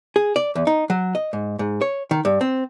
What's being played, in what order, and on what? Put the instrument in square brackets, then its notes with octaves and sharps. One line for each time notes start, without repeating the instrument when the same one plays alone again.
[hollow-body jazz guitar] G#4
D5
E2
D#4
F#3
D#5
G#2
G#2
C#5
D#3
G2
C4